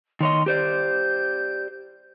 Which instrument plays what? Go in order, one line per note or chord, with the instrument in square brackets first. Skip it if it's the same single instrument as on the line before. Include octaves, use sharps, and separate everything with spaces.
[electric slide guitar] D#3 C#5 D#5 [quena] C6
[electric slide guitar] G4 C5 D5 [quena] G6